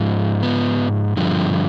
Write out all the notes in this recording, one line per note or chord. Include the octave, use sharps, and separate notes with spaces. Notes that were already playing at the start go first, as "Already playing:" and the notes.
Already playing: G#2 F3
B3
G2 D3 F3